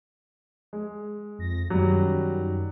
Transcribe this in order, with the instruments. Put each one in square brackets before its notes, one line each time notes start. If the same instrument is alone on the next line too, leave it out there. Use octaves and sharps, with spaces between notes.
[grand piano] G#3
[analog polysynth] F2 A#6
[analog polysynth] F#2 D#3 [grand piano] F#3 G3